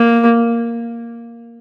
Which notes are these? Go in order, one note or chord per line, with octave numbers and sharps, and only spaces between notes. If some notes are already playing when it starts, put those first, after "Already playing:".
Already playing: A#3